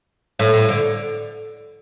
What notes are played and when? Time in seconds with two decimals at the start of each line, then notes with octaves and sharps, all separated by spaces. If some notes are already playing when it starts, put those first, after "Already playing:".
0.39 A2
0.54 A2
0.69 D3